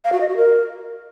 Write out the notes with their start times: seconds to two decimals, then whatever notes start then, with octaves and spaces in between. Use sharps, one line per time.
0.04 F5
0.13 F#4
0.21 D#5
0.29 F#4
0.37 A#4